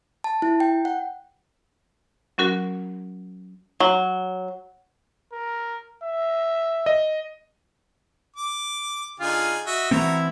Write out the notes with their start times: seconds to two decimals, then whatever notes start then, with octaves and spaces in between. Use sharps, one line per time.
0.24 A5
0.42 E4
0.60 G5
0.85 F#5
2.38 F#3 C#4 F#4 A#4
3.80 F#3
5.32 A#4
6.03 E5
6.86 D#5
8.36 D6
9.20 D3 D#4 F4 G#4
9.66 F#4 D#5 E5
9.91 E3 A3 C4 E4 F#4 A#5